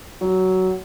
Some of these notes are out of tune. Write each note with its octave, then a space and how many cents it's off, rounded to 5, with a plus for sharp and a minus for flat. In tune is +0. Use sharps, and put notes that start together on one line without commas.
F#3 +15